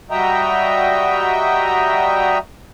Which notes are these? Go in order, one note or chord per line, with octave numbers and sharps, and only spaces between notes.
G3 F#4 D#5 E5 G5 A#5